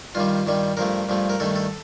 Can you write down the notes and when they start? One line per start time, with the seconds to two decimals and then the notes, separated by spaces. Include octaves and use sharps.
0.15 G2 D#3 G3 F4
0.46 G2 D#3 G3
0.77 G2 F3 A3 A#4
1.09 G2 F3 A3
1.30 A#4
1.40 G2 D#3 A3 A4
1.56 A4